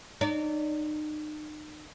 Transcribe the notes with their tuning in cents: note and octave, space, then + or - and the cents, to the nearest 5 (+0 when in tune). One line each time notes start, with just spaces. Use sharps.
D#4 -35 D5 -25